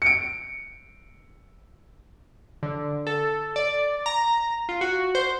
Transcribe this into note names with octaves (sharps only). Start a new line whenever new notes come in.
C#7 D7
D3
A4
D5
A#5
F4
F#4
C5